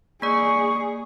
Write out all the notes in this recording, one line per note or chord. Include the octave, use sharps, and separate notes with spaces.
A#3 G#4 D5 C#6